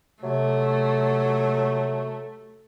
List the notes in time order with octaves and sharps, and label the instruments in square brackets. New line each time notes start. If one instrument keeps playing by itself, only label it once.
[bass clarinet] C3 [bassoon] F#3 [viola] A3